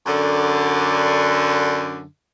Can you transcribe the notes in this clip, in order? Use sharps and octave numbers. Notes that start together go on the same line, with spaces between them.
F#2 D3